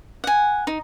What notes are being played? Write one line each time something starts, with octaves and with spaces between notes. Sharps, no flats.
F#5 G#5
D#4